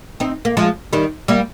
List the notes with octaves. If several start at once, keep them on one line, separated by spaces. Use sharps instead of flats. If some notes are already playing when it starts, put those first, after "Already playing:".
C4 D#4
A#3
F3 G#3
D#3 G3
G3 A#3